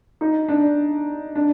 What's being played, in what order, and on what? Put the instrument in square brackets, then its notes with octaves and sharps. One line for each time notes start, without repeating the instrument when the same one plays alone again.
[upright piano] D#4
D4
D4